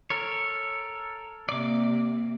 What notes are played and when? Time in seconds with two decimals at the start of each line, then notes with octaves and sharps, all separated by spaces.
0.10 A4 A#4 C#5
1.49 C3 A#3 D5 D6